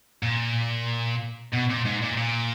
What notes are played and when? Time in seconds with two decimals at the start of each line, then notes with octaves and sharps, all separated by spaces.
0.23 A#2
1.53 B2
1.69 A#2
1.85 G#2
2.02 A#2
2.17 A#2